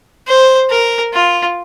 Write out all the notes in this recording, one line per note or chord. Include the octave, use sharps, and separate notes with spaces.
C5
A#4
F4